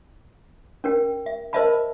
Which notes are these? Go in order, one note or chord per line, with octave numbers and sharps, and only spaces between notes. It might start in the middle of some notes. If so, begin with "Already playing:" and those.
C#4 A#4 G5
E5
A#4 C5 D#5 E5 A5 B5